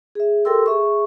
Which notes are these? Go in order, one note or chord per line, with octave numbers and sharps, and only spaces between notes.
G#4 E5
G4 A4 A#4 G5 C6 E6
G#4 E5 C#6